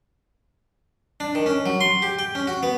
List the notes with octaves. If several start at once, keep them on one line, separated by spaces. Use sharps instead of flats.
D4
D#3
C#4
F#3
C6
G4
G5
C#4
F#4
B3